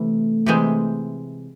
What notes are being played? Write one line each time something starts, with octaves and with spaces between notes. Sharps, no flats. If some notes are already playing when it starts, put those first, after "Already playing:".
Already playing: C3 E3 A3
C3 E3 G#3 C4